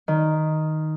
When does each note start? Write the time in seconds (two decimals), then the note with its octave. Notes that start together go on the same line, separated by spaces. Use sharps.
0.08 D#3